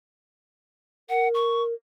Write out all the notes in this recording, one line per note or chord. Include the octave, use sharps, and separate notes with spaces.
A#4 F#5
C#6